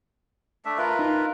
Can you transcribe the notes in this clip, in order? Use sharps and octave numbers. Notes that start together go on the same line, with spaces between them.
A3 D4 E5
F4 A#4 B4 E5
D#4